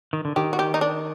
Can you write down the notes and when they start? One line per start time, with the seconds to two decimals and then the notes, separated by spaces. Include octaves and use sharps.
0.13 D#3
0.25 D3
0.36 D#3 G4
0.53 F#4
0.59 G4
0.74 D#4
0.81 D4